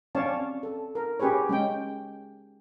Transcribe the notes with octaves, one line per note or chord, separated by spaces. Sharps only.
C4 C#4 C#5 D5 F5 A5
A4
A#4
C#4 G4 G#4 B4 C#5
G#3 C#4 G5